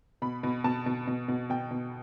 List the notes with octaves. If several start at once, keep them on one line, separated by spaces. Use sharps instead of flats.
B2 B5
B2
B2 A5
B2
B2
B2
B2 G5
B2